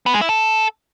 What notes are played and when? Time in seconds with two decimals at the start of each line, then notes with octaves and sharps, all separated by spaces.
0.06 B3
0.14 G#3
0.21 E4
0.29 A4